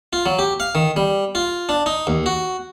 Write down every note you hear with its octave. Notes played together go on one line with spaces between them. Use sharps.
F4
F#3
G4
F5
D#3
G3
F4
D4
D#4
D#2
F#4